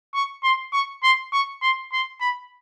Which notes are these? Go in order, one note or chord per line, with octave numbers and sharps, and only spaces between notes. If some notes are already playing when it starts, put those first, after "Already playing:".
C#6
C6
C#6
C6
C#6
C6
C6
B5